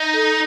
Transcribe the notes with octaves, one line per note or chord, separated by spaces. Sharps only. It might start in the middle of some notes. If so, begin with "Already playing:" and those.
Already playing: D#4
A4